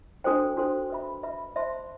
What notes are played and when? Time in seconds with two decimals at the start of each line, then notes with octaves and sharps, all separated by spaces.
0.24 D4 F#4 A4 C5 G5
0.57 D4 F#4 A4 C5 G5
0.90 B4 E5 B5
1.23 B4 E5 B5
1.56 C5 E5 A5 C6